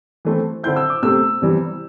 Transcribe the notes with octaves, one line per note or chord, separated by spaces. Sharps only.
E3 A3 C4
D3 C4 E4 G6
E6
D6
C3 A3 C4 E6
C3 E3 G3